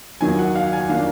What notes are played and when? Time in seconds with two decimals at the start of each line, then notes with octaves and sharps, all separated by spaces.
0.21 D#2 D#3 F#3 G#5
0.39 F#5
0.56 F5
0.73 G#5
0.89 D#3 A#3 D4 F5